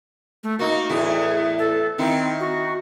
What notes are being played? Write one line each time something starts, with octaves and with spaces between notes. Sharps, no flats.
A3
A#3 D#4 F#4
E2 A2 E4 G#4
A4
D#3 C4 D#4 E4
F#4